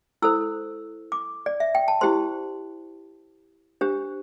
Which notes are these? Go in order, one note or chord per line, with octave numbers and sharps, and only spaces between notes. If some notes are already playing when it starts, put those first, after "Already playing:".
E4 A4 C5 E6
D6
D5
E5
G5
A5
E4 G4 C5 C6
D4 G4 C5